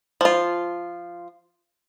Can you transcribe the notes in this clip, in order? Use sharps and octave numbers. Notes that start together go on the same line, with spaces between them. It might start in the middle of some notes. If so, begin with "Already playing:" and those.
F3 F4